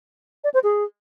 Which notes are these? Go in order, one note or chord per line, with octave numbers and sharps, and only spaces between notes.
D5
C5
G#4